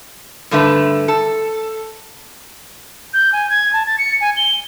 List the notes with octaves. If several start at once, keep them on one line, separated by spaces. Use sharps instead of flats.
G2 D3 A3 D4 B4
A4
G6
G#5
G#6
A5
A6
C#7
G#5
G7